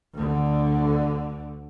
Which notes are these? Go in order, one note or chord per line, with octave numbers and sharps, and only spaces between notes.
D2 D3